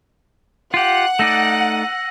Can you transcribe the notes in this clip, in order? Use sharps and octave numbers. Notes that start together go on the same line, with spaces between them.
F4 G4 F#5
A3 D#4 D5 E6 A#6 D#7